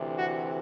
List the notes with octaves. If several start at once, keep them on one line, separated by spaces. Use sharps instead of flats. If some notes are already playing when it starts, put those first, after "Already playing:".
Already playing: D2 C3 E3
F#4